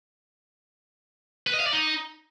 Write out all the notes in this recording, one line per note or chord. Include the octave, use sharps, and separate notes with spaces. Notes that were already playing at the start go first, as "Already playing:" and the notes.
B4
D#5
F5
D5
D#4